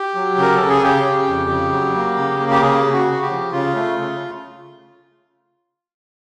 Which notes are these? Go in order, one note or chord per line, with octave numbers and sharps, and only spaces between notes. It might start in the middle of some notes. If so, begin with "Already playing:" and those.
Already playing: G4
F#3
C#3 A#4
C#3 A4
G#4
C#3 G4
C#3
F2
C#3
F#3
A#3
C#3
A#3
G4
C#3 G#4
C#3
F#4
C#3
G4
F3
C#3 F4
A3
C#3